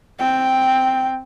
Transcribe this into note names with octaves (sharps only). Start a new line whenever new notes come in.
C4 G5